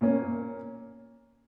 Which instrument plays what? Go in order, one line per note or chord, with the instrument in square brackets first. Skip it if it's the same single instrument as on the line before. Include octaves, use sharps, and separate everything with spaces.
[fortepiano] A#2 A#3 C#4